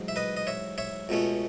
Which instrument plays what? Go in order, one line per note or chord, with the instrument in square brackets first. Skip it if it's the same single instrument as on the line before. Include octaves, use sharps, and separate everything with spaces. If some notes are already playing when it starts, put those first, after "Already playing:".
Already playing: [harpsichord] A1 G#2 F#3
E5
B4 D#5
D#5
C#5 E5
C#5 E5
C#2 B2 A3 C#4